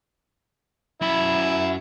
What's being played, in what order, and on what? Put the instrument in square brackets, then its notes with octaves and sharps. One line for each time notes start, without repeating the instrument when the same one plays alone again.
[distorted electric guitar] F#2 B5 [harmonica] E4